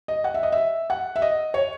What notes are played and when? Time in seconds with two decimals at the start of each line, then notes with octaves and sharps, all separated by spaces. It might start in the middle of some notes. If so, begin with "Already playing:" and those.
0.08 D#5
0.24 F#5
0.34 E5
0.43 D#5
0.52 E5
0.90 F#5
1.16 E5
1.22 D#5
1.54 C#5